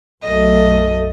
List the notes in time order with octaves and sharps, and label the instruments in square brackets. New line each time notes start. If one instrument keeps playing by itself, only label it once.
[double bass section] B1 F#2 A3 [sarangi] D#5